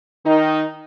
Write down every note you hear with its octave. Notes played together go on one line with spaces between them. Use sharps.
D#3 D#4